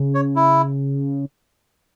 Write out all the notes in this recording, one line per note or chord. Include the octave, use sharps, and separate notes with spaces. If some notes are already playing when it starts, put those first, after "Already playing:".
Already playing: C#3
C#5
E4